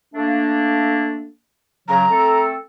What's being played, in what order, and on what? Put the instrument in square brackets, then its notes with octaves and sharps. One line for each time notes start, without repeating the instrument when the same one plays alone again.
[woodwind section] A3 A#3 D4
[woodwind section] C#3 F#3 [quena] A#5
[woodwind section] A3 C4 A4